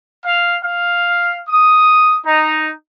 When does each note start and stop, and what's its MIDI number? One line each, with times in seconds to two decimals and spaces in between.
0.24 0.57 77
0.63 1.39 77
1.49 2.19 87
2.25 2.71 63